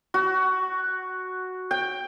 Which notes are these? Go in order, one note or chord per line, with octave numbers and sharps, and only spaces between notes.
F#4
G5